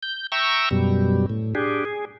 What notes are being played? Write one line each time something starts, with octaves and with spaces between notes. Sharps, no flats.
G6
E5 G5 A#5 C#6 E6
F#2 B2 G3
A2
D4 G4 G#4
G#4